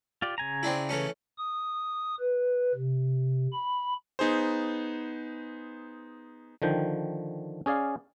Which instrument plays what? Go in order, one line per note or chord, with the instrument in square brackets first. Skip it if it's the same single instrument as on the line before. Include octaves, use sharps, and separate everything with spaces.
[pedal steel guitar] F4 G4 D5
C#3 G#5 A#5
[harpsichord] C4 D4 E4
E3 A3 C#4
[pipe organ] D#6
B4
C3
B5
[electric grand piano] B3 D#4 G#4 C5
[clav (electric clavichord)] D3 D#3 F3 G5
C#4 G#4 D5 F5